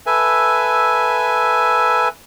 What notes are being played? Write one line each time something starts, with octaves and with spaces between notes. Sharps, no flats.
A4 B4 E5 G#5